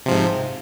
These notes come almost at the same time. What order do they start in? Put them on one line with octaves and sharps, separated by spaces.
C3 F3 G#2